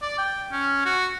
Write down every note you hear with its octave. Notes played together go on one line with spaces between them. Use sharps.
D5
G5
C#4
F#4